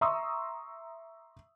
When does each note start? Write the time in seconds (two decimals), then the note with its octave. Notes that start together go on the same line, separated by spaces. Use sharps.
0.01 E5 A#5 C6 C#6 D#6 E6